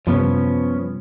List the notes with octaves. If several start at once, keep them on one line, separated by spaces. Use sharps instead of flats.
F#2 C3 F3 G3 B3 C#4